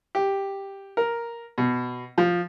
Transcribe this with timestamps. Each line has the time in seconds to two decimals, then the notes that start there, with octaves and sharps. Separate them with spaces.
0.15 G4
0.97 A#4
1.58 B2
2.18 F3